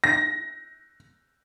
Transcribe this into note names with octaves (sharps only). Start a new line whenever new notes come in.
A#6